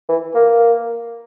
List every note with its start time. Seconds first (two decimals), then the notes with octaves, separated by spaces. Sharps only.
0.09 E3
0.35 A#3